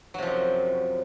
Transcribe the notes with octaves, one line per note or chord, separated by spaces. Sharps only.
F#2 C3 F3 F#3